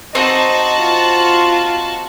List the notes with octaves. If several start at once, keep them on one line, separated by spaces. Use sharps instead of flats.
C4 D#4 F#4 C5 D#5 A5
F4